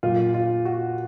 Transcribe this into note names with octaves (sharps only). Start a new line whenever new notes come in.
A#2 F#3 F4
F4
F#4